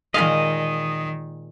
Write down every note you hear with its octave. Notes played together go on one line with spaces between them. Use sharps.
A#2 D#3 G#3 D#5 F5